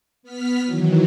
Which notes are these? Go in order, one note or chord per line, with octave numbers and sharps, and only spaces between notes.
B3 F6 B6
D#3 E3 F#3